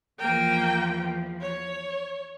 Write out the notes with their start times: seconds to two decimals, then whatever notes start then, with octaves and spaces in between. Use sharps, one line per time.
0.19 E2 F3 A#3 G5
1.41 C#5